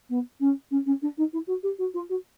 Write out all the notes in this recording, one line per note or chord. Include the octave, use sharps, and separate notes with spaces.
B3
C#4
C#4
C#4
D4
D#4
E4
F#4
G4
F#4
F4
F#4